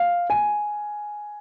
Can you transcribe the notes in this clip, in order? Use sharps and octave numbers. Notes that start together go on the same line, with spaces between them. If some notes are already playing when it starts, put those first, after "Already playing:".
Already playing: F5
G#5